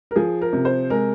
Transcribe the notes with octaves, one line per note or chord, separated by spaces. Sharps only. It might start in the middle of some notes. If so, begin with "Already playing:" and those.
A#4
F3 G#4
A#4
C3
C5
G#3 A#4